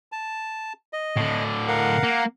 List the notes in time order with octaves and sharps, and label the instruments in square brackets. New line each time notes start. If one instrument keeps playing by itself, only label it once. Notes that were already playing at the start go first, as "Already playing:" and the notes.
[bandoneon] A5
D#5
[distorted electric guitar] A2 D3
[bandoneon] A#4 F5 F#5
[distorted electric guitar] A#3